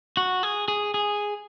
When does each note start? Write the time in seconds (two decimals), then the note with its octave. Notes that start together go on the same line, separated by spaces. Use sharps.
0.17 F#4
0.43 G#4
0.68 G#4
0.94 G#4